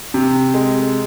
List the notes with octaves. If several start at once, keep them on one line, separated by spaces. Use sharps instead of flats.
C3
G#3